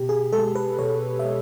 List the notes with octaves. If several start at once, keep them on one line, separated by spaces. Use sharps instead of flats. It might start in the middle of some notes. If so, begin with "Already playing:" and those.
Already playing: B2 G4
G#4
G#3 A4
B4
B2 C#5
E5
G#3 D#5